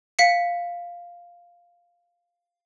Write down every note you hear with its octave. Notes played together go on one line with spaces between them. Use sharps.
F5 B6 C#7